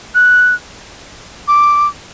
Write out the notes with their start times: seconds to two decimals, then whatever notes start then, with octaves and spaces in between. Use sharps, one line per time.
0.15 F#6
1.48 D6